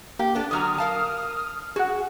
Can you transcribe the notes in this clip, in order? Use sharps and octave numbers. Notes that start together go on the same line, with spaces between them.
A#3 G4
B3 D4 A4
D3 F#3 A#5 D#6 F6
A#4 F5 A5
F#4 G#4 F#5